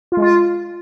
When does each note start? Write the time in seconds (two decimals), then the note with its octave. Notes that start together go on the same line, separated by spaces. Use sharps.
0.12 F4
0.17 G#3
0.22 F4